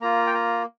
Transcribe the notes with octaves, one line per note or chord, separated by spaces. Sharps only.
A#3 F4 A#5
G5
A#5